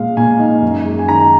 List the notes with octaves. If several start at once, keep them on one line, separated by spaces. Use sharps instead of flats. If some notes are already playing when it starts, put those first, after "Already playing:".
Already playing: A#2 G#3 F5
A#2 G#5
D#4
F#2
G#3
G#5
D#3 A#5